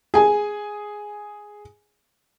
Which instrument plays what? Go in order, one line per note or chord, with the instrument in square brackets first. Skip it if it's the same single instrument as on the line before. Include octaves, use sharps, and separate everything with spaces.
[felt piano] G#4 G#5